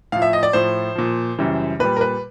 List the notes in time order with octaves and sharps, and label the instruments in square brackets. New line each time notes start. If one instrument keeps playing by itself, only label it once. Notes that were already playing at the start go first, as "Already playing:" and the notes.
[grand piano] A2 F3 F5
E5
D#5
D5
A2 F3 C5
A#2 F3
F#2 C#3 E3 G3
A#2 G3 B4
A#4
B4